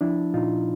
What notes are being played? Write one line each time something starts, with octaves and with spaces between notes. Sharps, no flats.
F3 D4 E4
A#2 D#4 F4